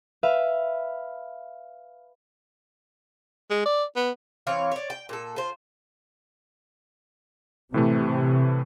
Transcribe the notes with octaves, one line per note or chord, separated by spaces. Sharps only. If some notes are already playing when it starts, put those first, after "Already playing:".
B4 E5 F5
G#3
D5
B3
E3 C4 C#5 F5
C#5 D5
G5
A#2 A4
F4 C5
A2 C3 E3 A3